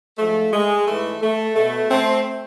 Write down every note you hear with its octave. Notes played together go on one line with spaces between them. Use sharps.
G#2 F3 A3
G#3
G#2 E3 A3
A3
B2 A3
A3 C4